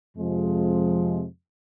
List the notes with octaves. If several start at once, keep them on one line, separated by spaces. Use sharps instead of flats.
F2 C3 F3 G#3